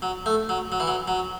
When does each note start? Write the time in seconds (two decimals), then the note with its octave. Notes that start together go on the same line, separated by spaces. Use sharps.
0.02 F#3
0.26 A3
0.49 F#3
0.72 F#3
0.80 E3
0.87 F#3
1.08 F#3